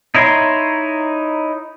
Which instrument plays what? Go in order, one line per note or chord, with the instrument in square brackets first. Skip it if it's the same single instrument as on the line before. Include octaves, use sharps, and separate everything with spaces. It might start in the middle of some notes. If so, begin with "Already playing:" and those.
[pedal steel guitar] D#4 E4 C#5 A#5 C6